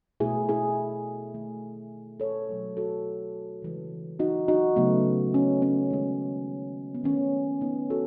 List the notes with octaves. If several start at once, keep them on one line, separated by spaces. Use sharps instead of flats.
B2 A3 E4 G#4
E4 G#4
D#3 A3
A4 C#5
B2 F#3 A3
F#4 A4
C#3 E3 G#3
D#4 F#4
D#4 F#4
C#3 F#3 A3 B3
C#4
C#4
D#3 G#3
B3
D#3 A3 C#4
B3 D#4
F#4 A4